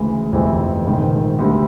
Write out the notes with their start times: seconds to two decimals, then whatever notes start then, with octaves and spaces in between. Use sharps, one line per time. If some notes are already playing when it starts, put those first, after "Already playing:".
Already playing: D2 C#3 E3 G#3
0.32 G1 F2 C3 E3 A3
0.85 A#1 G#2 D#3
1.39 D2 D3 G3